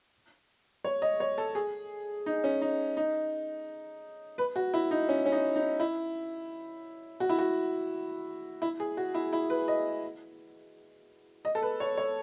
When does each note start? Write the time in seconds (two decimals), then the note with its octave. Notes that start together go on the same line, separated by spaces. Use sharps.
0.84 C#5
1.02 D#5
1.20 C#5
1.38 A4
1.55 G#4
2.26 D#4
2.44 C#4
2.61 D#4
2.97 D#4
4.38 B4
4.56 F#4
4.74 E4
4.91 D#4
5.09 C#4
5.26 C#4
5.32 D#4
5.56 D#4
5.80 E4
7.20 F#4
7.29 E4
7.39 F#4
8.62 E4
8.80 G#4
8.97 F#4
9.14 E4
9.33 E4
9.50 B4
9.68 D#5
11.45 D#5
11.55 A4
11.62 B4
11.80 C#5
11.97 C#5